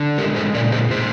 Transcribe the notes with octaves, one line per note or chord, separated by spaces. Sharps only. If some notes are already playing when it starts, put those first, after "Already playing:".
Already playing: D3
G#3 G4 A#4
G#4 C5
A#2 A#4 D5
G#4 C5
A#2 G#4 C5